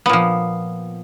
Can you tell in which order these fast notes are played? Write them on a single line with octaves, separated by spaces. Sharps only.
B3 A#2 F3